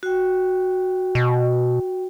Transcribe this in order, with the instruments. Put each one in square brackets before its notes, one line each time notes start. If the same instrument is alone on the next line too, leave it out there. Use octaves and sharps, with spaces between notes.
[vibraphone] F#4 G5
[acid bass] B2